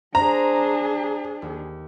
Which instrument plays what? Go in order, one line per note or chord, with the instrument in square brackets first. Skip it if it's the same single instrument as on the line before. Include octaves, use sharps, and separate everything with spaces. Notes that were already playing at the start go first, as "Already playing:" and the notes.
[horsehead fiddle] D4 G#4 [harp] C5 [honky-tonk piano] A#5
[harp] D#2